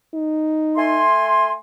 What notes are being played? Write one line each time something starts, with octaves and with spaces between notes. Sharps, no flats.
D#4
A3 G#5 C6